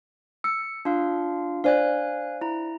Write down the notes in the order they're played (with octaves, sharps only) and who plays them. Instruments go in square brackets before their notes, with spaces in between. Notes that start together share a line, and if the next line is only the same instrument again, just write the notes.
[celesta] E6 [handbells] C#7
[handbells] D4 F4 F5
[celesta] D4 C5 D5 [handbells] F5 G#5 F#6
[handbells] E4 A#5